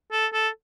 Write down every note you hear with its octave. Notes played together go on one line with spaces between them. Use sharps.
A4
A4